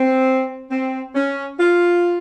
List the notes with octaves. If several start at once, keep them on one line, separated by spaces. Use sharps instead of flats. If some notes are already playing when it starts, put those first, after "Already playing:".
Already playing: C4
C4
C#4
F4